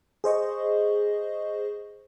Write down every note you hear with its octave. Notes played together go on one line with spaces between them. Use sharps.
G#4 C5 D#5 C#6